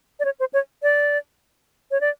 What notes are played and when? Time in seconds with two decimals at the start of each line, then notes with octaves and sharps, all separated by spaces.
0.20 D5
0.25 C#5
0.40 C5
0.53 C#5
0.83 D5
1.91 C#5
2.01 D5